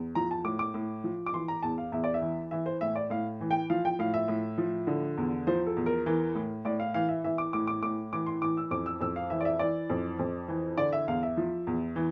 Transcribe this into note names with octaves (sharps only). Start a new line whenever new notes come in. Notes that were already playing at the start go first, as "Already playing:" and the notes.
Already playing: E2
F3 A#5
A5
A2 D6
D6
A2
F3
D6
E3 C6
A#5
E2 A5
F5
E2 E5
D5
E5
E3
E3 E5
C5
A2 E5
D5
A2 F5
E3
G5
F3 F5
G5
A2 F5
E5
A2
F3
D3
E2
F3 C5
A4
E2
A#4
E3 A#4
A2
A2 D5
F5
E3 F5
E5
E3 E5
D6
A2 D6
D6
A2 D6
E3 D6
C6
E3 D6
E6
F2 D6
E6
F2 E6
F5
E3 E5
D5
E5
E3 D5
F2
F2
E3
D3 D5
E5
E2 F5
E5
F3
E2
E3